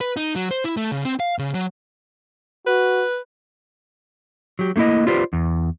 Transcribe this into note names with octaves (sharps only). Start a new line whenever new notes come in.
B4
D#4
F#3
C5
E4
A3
C#3
C4
F5
C#3
F#3
F#4 B4
F#3 G4
A3 A#3 D#4 E4 D#5
F4 G4 B4 C5 D5
E2